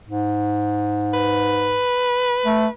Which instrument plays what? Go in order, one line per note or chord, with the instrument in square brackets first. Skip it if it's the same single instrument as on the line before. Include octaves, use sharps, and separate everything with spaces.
[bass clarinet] G#2
[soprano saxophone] B4
[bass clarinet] A3